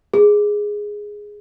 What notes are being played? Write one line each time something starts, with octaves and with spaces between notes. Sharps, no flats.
G#4